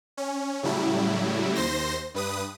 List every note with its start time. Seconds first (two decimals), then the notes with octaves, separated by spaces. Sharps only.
0.17 C#4
0.63 A2 C#3 F#3 G3 E4
1.55 D#2 C5 C6 A#6
2.14 G2 B4 D#6